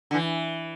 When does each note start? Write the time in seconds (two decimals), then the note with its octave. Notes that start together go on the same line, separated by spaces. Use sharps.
0.11 D3
0.14 E3